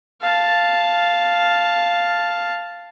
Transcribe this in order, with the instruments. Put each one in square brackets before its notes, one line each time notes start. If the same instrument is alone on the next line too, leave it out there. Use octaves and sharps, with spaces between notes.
[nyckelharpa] F5 A5